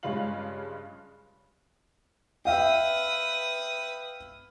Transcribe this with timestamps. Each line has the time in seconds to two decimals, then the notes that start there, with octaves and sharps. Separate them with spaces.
0.03 G2 C#3 G#3 F4 F5 F#7
2.45 B4 E5 F5 G5 D#6